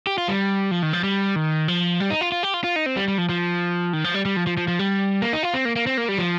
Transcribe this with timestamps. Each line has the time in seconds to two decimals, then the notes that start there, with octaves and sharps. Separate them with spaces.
0.07 G4
0.18 F4
0.28 G3
0.71 F3
0.83 D#3
0.93 F3
1.04 G3
1.36 D#3
1.68 F3
2.00 G3
2.10 D#4
2.21 F4
2.32 F4
2.43 G4
2.54 F4
2.64 F4
2.76 D#4
2.86 C4
2.97 G3
3.08 G3
3.18 F3
3.29 F3
3.93 D#3
4.04 F3
4.14 G3
4.25 G3
4.36 F3
4.47 F3
4.57 F3
4.68 F3
4.79 G3
5.22 A#3
5.33 D#4
5.43 F4
5.54 C4
5.65 A#3
5.76 A#3
5.87 C4
5.97 A#3
6.09 G3
6.18 F3